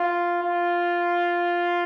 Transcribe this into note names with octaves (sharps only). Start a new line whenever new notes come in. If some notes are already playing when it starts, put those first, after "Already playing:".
Already playing: F4
F4